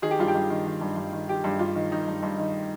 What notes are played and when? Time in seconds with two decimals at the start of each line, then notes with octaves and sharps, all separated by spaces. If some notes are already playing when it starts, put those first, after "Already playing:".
0.02 D#3 G#4
0.11 G4
0.19 G2 F4
0.28 G4
0.35 G2
0.50 D#3
0.66 D#3
0.81 G2
0.97 G2
1.13 D#3
1.28 D#3 G4
1.44 G2
1.59 G2 F4
1.75 D#3
1.91 D#3 D#4
2.08 G2
2.23 G2
2.38 D#3